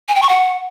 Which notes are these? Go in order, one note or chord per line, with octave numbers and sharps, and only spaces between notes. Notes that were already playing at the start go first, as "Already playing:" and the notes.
G#5
G5
C#6
F#5